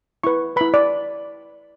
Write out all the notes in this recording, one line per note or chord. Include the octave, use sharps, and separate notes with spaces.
E4 B4 C#6
E4 B4 B5
D5